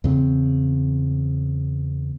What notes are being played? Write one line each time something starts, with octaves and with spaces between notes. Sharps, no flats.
E2 C#3 C4